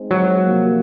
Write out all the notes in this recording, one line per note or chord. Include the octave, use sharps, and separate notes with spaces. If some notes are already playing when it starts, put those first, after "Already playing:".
Already playing: G#3 C4 D#4 G#4 C5
F#3
C3 F3 A#3